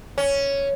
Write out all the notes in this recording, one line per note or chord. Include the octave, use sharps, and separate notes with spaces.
C#4